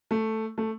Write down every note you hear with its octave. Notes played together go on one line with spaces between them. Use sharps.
A3
A3